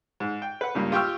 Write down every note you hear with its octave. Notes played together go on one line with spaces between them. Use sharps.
G#2
G5
B4 F#5
C#2 G2 A#3
F4 G4 G5 C#6 E6 F6